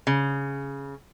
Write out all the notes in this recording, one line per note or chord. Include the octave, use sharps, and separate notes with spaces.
C#3